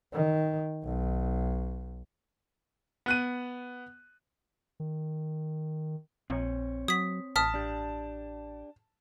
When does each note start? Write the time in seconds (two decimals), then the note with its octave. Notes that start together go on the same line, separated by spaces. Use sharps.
0.13 D#3
0.84 B1
3.06 B3 F#6 D#7
4.80 D#3
6.30 A#1 C4 C#5
6.88 F#3 D#6 B6
7.36 A1 A5 D#6 F6 B6
7.54 D4 G4